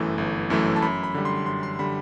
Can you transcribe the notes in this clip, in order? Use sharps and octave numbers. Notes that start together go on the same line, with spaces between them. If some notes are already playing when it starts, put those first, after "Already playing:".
Already playing: G1 F#2 E3 A3
G1
F#2 E3 A3
A5
F#2 B5
B5
D3 G3
C6
F#2 C6
C6
D3 G3 B5